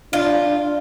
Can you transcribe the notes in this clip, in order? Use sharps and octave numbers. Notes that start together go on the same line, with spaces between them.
D4 F4